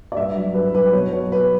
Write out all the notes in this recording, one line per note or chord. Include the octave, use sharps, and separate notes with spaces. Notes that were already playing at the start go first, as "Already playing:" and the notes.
D5
G2 E5
F#3
G2 B4
F#3 B4
B2 C#5
F#3 C#5
B2 B4